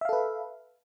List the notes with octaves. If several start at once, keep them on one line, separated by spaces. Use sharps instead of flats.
A4 B4 E5 F5